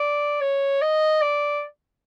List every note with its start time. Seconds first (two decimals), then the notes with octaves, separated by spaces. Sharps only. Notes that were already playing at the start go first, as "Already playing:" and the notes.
Already playing: D5
0.41 C#5
0.82 D#5
1.22 D5